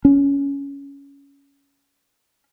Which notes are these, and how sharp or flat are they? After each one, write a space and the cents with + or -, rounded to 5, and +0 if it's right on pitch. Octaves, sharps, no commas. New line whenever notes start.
C#4 +15